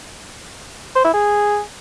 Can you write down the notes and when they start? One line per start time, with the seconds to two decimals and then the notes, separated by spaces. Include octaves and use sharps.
0.95 C5
1.05 E4
1.14 G#4